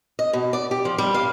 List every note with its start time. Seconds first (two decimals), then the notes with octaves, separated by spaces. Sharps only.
0.19 D#5
0.33 B2
0.53 D5
0.71 G4
0.85 F3
0.98 G3
1.14 F5